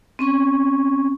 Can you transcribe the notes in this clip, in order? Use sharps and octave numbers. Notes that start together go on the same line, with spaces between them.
C4 C#4 C#6